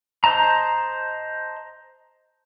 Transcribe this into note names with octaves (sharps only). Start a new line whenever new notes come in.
C5 D#5 A5 A#5